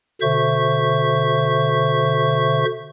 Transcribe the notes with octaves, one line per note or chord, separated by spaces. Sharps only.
B2 D3 C5 E5 C#6